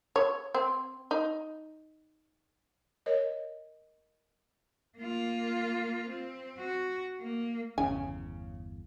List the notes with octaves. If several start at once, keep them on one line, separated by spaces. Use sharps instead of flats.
C#5
C4
D#4
A#4 C#5 D#5
A#3 F4
C4
F#4
A#3
G1 E2 C#3 G#5